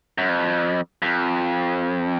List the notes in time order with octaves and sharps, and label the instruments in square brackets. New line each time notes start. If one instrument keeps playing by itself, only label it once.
[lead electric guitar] F#2
F2
F2